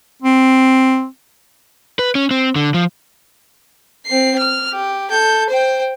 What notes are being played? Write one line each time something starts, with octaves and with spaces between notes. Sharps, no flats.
C4
B4
C#4
C4
D3
F3
C4 C7
F6
G4
A4 G6
C5 G5